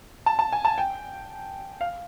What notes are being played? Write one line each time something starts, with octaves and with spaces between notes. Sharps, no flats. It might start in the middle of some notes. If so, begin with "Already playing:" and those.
A5
A5
G#5
A5
G5
F5